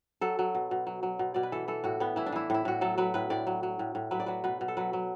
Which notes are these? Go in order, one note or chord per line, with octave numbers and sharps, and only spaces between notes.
F#3 A4
F#3
B2
B2
F#3
F#3
B2
B2 D5
B4
E3 A4
E3 A4
A2 F#4
A2 B3
E3 E4
D4
E3 E4
A2 E4
A2 F#4
F#3 A4
F#3 B4
A2 B4
A2 D5
F#3
F#3
A2
A2
F#3 B4
D5
F#3 B4
B2 B4
B2
A4
F#3 B4
F#3